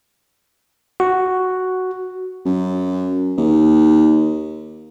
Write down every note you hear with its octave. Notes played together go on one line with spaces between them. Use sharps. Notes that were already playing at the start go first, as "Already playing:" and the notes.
F#4
F#2
D#2